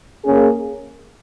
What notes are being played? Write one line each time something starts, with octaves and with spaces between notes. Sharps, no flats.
A#3 C#4 G#4